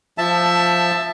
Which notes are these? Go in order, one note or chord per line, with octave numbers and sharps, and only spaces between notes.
F3 E5 A5